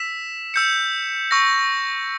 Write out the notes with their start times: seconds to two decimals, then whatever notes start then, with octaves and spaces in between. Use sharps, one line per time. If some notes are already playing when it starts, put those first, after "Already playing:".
Already playing: E6 B6 E7
0.54 E6 G6 C#7
1.31 C#6 E6 A#6